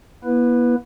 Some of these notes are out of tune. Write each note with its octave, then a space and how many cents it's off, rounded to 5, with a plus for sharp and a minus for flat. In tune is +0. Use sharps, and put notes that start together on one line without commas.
B3 -40 E4 +0 B4 +0